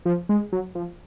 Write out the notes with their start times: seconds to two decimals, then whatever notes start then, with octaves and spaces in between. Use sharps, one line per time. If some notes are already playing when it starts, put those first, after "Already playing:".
0.06 F3
0.29 G#3
0.53 F#3
0.75 F3